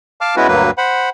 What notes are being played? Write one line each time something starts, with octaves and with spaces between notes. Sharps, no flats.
F5 A5 D6 F6
G#3 B3 C#4 E4 F#4 B4
D2 G2 F#3 A#3 B4
C5 F#5 B5